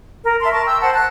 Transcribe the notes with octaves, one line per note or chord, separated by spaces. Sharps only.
A#4
E5 A5 C6
A#4 A5 C#6
G5 E6
C5 F#5 A5
A5 F#6